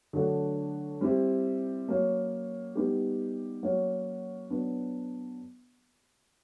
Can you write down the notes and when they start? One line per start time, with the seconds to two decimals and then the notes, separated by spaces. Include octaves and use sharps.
0.13 D3 F#3 A3 D4 F#4
1.01 G3 C4 E4 G4
1.88 F#3 A#3 C#4
2.75 G3 B3 D#4 G4
3.63 F#3 A#3 C#4 F#4
4.49 F#3 B3 D4